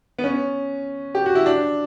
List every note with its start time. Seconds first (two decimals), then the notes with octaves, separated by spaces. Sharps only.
0.19 B3
0.24 C#4
1.15 G4
1.26 F#4
1.35 E4
1.46 D4